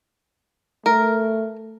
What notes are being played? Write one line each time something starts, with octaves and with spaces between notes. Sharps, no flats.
A3 A#4